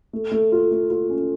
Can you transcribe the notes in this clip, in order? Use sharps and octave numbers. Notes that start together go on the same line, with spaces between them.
A3
A3
F4
A3
F4
C#4